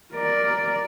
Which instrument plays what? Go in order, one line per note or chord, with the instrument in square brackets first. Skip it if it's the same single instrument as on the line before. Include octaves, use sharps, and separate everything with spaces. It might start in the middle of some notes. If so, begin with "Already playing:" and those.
[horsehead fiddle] A#4 D5